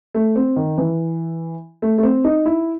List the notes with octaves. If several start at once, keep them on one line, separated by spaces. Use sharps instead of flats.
A3
C4
D#3
E3
A3
A3
C4
D#4
E4